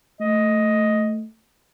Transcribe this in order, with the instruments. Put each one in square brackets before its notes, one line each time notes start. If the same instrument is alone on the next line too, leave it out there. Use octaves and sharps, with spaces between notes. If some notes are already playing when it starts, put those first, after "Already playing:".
[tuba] A3 [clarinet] D#5